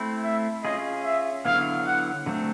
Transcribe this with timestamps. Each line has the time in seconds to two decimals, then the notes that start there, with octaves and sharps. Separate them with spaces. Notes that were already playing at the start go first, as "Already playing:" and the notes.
Already playing: A3 C4 E4
0.24 E5
0.64 C#4 F4 G#4 D#5
1.04 E5
1.45 D3 F#3 B3 E4 F5
1.86 F#5
2.26 D3 F#3 A3 C4